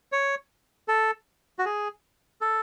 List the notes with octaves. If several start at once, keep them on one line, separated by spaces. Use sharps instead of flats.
C#5
A4
F#4
G#4
A4